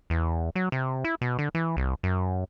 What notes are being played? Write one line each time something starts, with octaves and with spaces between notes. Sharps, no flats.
E2
F#3
C3
E4
B2
D3
E3
C2
F#2